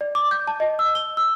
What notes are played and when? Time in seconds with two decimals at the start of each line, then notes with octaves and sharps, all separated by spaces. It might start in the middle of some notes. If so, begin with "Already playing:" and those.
0.01 D5
0.15 D6
0.31 G6
0.47 A5
0.60 D#5
0.79 E6
0.95 G7
1.17 E6